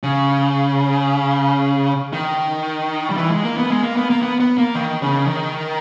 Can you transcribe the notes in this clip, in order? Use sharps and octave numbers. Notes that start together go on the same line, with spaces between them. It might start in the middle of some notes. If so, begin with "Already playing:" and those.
C#3
D#3
G3
E3
G#3
A#3
B3
G#3
A#3
B3
A#3
B3
B3
A#3
D#3
C#3
D#3